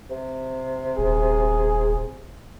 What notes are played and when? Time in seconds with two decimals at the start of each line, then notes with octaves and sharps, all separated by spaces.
0.10 C3
0.98 D#1 G#4